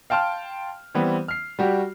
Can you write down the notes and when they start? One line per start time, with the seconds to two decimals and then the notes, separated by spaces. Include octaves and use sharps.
0.10 F5 G5 A5 C6 F6
0.94 E3 G3 B3 C4
1.28 F6 C7
1.59 G3 F#4 G4